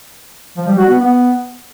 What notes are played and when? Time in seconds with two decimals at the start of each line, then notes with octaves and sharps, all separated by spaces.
0.57 F3
0.68 G3
0.78 F#4
0.89 B3
0.99 B3